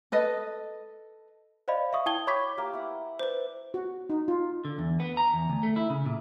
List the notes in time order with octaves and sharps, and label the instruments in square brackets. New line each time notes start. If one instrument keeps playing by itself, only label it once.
[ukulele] A4 B4 D#5
[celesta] C5 D5 D#5 F5 B5
E5 F5 C#6 D#6
E4 G5 A5 D#6 G#6 G7
C#5 B5 C#6 D6 G#6 B6
[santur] A#3 G4
E4 B4 F#5
[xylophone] B4 C5 [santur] D5
[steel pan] F#4
D#4
F4
[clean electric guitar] D3
E2
B3
A#5
E2
D2
A3
E4
C#3
A#2